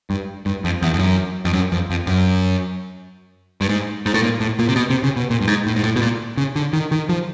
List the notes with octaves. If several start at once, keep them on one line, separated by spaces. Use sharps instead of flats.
G2
G2
F2
E2
F2
F#2
F2
F#2
F2
F2
F#2
G2
G#2
G#2
A2
A#2
A2
A#2
C3
B2
C3
C#3
B2
A#2
G2
G#2
A2
G#2
A2
B2
A#2
C#3
D3
D#3
D#3
F3